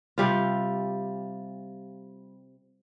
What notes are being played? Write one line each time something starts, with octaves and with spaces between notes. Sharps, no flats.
C3 G3 F4